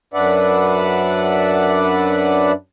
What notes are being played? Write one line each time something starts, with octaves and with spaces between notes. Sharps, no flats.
F#2 D4 B4 D5 E5 F#5